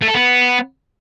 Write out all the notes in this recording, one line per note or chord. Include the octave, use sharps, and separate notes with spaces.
A3
A4
B3